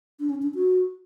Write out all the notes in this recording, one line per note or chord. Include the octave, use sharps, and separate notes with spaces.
D4
C#4
D4
F#4